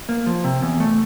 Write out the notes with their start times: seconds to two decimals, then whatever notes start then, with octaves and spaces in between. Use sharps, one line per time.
0.09 A#3
0.26 F3
0.44 C3
0.63 E2
0.80 A3